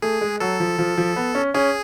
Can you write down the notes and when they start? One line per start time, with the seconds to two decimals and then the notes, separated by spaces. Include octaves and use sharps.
0.02 A3 G#4
0.21 G#3
0.40 F#3 A4
0.60 F3
0.78 F3
0.97 F3
1.16 B3
1.35 C#4
1.54 C#4 G#4